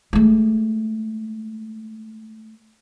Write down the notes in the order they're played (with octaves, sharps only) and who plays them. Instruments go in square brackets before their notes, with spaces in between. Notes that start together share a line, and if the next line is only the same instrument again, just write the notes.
[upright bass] G#3 A3